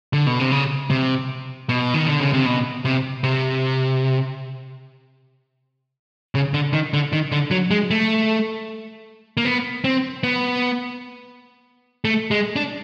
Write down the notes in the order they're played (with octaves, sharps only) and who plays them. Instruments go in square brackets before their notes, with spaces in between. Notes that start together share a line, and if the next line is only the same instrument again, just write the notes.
[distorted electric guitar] D3
B2
C3
C#3
C3
B2
D#3
D3
C#3
C3
B2
C3
C3
C#3
D3
D#3
D3
D#3
D3
F#3
G#3
A3
A#3
B3
C4
B3
A3
G#3
D4